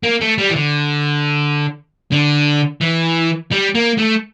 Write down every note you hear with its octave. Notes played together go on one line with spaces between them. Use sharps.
A#3
A3
G3
E3
D3
D3
E3
G3
A#3
A3